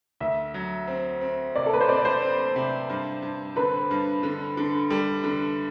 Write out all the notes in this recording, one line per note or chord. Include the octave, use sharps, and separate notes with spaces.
D2 E5
F#3
C4
C4
C3 D5
A4
B4
C5
C4 D5
C5
C4
C3
G2
G2
D3 B4
G2
D3
D3
G3 A4
D3